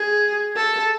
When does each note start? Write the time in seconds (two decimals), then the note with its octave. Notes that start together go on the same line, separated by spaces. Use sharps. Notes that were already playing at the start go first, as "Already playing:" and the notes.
Already playing: G#4
0.56 A4